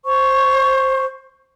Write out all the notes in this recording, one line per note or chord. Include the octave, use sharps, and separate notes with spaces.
C5 C#6